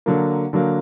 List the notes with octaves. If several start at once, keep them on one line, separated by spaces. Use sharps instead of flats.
D3 F#3 A#3
D3 F#3 A#3